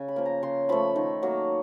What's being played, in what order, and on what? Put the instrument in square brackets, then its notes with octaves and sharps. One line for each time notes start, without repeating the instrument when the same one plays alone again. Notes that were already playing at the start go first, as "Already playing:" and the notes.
Already playing: [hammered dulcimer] C#3
B5
F3 A#3
A#5
C#3 C6
F3 A3 B5
D#3
F#3 A#3